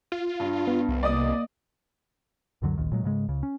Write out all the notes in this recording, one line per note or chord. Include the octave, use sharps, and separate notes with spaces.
F4
G2 D4
B3
C2
A#3 D5 D#5 D#6
C#2 F#2 D3 F#3
D1 A#1 D#2 D#3
A#2 F#3 G#3
G#2 C#3 G#3
C#2 C#3
C#4